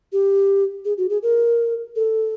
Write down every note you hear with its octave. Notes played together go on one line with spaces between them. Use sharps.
G4
G#4
F#4
G#4
A#4
A4